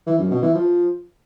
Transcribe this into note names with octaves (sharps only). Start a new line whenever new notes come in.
E3
F#2
B2
E3
F3